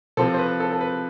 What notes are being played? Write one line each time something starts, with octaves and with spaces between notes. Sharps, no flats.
C3 F3 C4 A4
C5
B4
A4
A4
B4